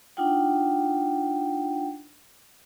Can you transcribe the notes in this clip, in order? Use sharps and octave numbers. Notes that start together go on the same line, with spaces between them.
D4 D#4 F4 F#5 G5